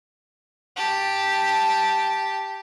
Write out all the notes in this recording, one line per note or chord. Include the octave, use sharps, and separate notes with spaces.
G4 A5